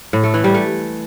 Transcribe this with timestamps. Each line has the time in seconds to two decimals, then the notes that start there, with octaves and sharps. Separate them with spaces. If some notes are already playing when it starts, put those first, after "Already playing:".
0.13 A2
0.23 A3
0.34 E3
0.44 G3
0.54 A3